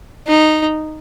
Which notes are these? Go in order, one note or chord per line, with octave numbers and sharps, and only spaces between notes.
D#4